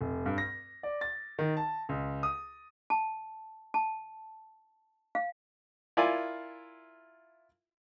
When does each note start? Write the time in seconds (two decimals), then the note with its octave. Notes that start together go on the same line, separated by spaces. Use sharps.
0.01 F1
0.26 G2
0.38 A#6
0.83 D5
1.01 A6
1.39 D#3
1.57 A5
1.89 C#2
2.23 D#6
2.90 A5
3.74 A5
5.15 F5
5.97 E4 F4 A#4 D5 F5 G#5